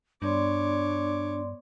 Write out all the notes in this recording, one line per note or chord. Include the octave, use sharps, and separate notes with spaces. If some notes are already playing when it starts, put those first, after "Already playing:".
G2 B3 D4 C#5 D5 C6 D6